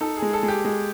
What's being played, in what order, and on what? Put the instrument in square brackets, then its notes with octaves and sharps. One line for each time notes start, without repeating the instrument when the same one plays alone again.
[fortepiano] D#4 [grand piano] A4
[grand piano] G#4
[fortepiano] G#3
[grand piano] A4
[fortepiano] G#3
[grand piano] G4
[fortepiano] G#3